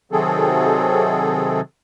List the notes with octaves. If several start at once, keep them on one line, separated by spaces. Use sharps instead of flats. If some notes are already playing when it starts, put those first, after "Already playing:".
C3 D#3 F#3 C4 G#4 A4